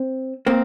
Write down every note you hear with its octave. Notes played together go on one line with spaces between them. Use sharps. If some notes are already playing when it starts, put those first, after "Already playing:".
Already playing: C4
A#3 C4